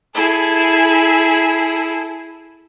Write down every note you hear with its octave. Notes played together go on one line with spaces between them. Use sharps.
E4 G#4 A4